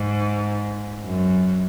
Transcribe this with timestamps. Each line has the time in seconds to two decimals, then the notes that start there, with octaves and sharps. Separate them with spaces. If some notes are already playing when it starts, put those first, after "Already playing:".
Already playing: G#2
1.06 F#2